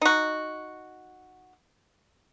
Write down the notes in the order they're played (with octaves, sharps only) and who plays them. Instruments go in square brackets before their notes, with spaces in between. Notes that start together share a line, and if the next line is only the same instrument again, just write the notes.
[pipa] D#4 F#4